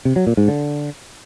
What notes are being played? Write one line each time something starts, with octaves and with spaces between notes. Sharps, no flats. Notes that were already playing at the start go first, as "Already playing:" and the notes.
C3
F#3
A#2
G#2
D3